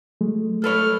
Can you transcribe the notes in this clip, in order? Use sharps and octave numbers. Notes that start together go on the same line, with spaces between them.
F#3 G#3 A3
A4 B4 C#5 F6